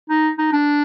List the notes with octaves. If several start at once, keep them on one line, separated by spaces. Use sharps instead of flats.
D#4
D#4
D4